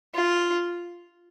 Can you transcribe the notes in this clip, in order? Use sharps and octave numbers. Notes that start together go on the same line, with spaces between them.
F4